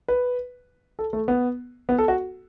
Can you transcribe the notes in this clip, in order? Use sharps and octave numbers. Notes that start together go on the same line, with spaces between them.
B4
A4
A3
B3
B3
A4
F#4